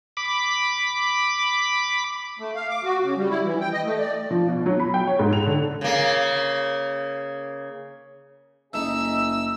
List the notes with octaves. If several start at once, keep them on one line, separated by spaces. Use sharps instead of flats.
B5 D6
A3
F5
D6
F#4
C#3
G3
E4
E3
G5
D#5
A3
D5
F3
B2
F#3
B5
G5
C#5
G#2
F7
D3
C#3 A#3
F#1 A3 D#4 G#4 D#5 E5 E6